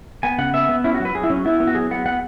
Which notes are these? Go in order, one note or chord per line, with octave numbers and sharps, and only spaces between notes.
B3 G#5
C#3 F#5
B3 E5
B3
C#4 E4
F#4
F#3
B4
F#3 G#4
E4
F#3 C#4
B3 E4
B3
F#4
F#3 G#4
B3 F#5
B3 F#5